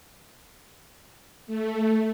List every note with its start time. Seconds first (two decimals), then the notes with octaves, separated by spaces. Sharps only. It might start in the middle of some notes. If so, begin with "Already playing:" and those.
1.47 A3